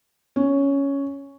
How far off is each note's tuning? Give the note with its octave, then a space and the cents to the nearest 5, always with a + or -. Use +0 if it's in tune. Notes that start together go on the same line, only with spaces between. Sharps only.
C#4 +5